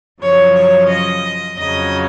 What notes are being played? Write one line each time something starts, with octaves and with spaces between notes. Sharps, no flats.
F#2 C#3 F3 C#5
C#5
D#5
F2 C#3 F#3 D#5